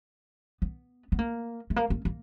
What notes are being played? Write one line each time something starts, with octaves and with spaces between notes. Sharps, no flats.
B3
B3
A#3
A3
A#3
A#3
A#3